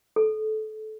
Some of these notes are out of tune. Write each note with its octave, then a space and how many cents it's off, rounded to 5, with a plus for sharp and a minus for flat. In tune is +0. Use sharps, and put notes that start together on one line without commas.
A4 -25